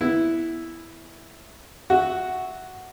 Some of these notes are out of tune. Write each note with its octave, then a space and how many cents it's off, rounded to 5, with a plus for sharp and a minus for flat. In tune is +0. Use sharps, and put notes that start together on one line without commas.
B3 +0 E4 +0
F#4 +0 E5 -10